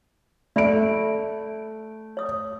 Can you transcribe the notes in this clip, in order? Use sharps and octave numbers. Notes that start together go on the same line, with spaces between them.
A3 D5 E5 B5 D7
C#5 D#6